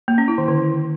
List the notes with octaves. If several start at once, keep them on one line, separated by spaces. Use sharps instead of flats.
A#3
C#4
E4
D#3
D3